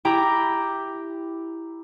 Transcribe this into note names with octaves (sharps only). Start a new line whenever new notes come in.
E4 G4 G5 A#5 B5 D6